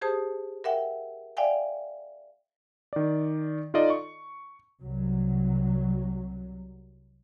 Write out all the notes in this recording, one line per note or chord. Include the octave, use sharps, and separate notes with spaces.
G4 G#4 C5 A5 D#6
A#4 E5 F#5 G5
D5 E5 F5 G5 G#5
D#3 D5
D#4 F4 A4 D5 D#5
C#6
C2 F#3